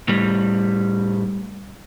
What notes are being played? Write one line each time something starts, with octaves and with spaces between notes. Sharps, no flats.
A2 G3